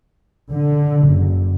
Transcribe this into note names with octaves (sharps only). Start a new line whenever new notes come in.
D3
F#1